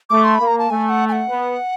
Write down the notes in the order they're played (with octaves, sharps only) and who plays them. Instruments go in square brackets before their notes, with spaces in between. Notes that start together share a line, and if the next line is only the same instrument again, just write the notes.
[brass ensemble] A3 [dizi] D6
[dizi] C6
[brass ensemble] A#3 [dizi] B5
[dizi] A#5
A5
[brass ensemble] A3 [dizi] G#5
[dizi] F#5
G#5
F#5
[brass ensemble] B3